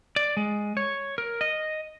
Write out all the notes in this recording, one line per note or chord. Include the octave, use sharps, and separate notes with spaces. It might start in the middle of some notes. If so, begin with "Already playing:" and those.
D5
G#3
C#5
A#4
D#5